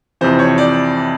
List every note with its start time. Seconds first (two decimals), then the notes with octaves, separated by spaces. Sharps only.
0.21 F2 C3 E3 C5
0.39 C#5
0.58 D5